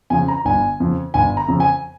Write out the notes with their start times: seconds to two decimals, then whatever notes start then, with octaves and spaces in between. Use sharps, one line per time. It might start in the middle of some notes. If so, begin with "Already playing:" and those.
0.10 F2 C#3 G#5
0.28 A#5
0.45 G1 G#5
0.80 F2 C#3
1.14 G1 G#5
1.37 A#5
1.48 F2 C#3
1.60 G#5